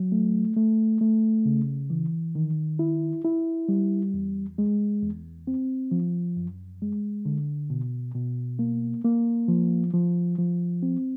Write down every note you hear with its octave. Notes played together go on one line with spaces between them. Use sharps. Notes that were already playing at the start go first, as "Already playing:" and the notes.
Already playing: F#3
A3
A3
A3
C#3
E3
D#3
E4
E4
G3
E2
G#3
E2
C4
F3
F#2
G#3
D3
B2
B2
A#3
A#3
F3
F3
F3
C4